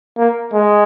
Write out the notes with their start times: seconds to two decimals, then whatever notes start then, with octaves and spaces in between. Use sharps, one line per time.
0.18 A#3
0.54 G#3